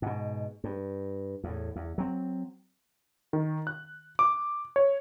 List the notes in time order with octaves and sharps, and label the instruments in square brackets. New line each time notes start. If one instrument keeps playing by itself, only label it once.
[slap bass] G#2 B2
G2
E2 A2
E2
F#3 C4
[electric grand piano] D#3
F#6
D6
C#5